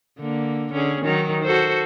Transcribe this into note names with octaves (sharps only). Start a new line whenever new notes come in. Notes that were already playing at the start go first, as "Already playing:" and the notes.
D3 A#3
D3 C#4 G#4
D#3 F#3 D#4
F#4 A4 C5